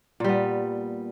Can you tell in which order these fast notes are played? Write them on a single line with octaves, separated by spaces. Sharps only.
A#2 G3 B3